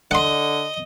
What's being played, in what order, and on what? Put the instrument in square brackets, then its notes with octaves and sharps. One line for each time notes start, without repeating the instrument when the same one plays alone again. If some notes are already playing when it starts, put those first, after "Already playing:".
[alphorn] D3 [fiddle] D#5 [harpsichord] F#5 C6